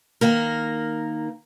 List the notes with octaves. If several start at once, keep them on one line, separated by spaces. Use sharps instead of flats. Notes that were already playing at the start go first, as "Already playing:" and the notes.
D#3 A#3 A#4